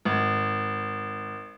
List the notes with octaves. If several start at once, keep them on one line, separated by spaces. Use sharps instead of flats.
G#1